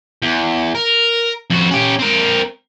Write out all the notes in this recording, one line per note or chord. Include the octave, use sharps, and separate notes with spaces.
E2
A#4
F2 F#4
C#4 G4
C4 A#4